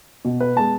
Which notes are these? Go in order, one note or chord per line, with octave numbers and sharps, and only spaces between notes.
B2
B4
G#3 B3 A5